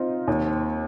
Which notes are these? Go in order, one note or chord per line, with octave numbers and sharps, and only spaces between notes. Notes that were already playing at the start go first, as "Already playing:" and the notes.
Already playing: C4 D#4 F4
D#2